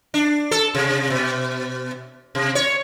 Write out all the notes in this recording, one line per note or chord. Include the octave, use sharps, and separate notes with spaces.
D4
A4
C3
B2
C3
C#5